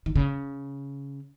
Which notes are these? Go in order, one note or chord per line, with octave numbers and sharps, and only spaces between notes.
D#3
C#3